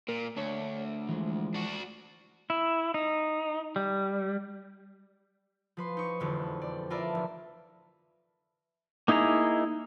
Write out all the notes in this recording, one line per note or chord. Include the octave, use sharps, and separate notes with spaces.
A#2 A#4
D2 D4 C#5
E3 F3 G#3
D4 F#4
E4
D#4
G3
F3 B4 C6
D#4 C#6
E1 F2 D3
D5
F4 A#4 B4 D5 E5 A5
F1
A#3 D#4 E4 G#4 A#5